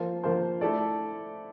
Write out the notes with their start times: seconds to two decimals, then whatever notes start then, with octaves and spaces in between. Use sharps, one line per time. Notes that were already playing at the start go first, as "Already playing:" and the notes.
Already playing: F3 A#3 F4 C5
0.24 F3 A#3 F4 C5
0.61 A3 E4 A4 D5